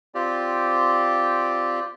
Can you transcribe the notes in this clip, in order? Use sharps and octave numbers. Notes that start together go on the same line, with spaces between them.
C4 F4 G4 D5